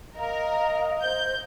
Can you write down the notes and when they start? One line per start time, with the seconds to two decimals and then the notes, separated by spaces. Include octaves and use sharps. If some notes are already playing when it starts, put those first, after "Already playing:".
0.17 A#4 D#5 F5
1.02 C5 G6